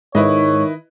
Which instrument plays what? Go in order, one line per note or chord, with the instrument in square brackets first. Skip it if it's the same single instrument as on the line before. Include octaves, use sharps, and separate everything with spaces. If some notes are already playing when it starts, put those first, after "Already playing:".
[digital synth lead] G#2 [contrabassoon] D#3 [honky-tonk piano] E4 B4 D#5 [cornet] C#5